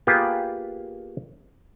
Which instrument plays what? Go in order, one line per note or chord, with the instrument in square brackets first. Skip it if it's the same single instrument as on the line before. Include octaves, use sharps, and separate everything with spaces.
[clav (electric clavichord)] A#3 B3 F4 G4 G#4 B4